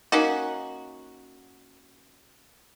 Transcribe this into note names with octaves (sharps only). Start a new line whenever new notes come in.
A#3 C#4 D#4 F#4